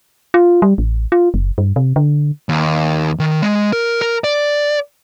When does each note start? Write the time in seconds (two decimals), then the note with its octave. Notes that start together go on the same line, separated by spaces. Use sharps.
0.34 F4
0.62 G3
0.78 A1
1.12 F4
1.34 F#1
1.58 G2
1.76 C3
1.96 D3
2.49 D#2
3.19 D#3
3.42 G#3
3.73 A#4
4.02 A#4
4.24 D5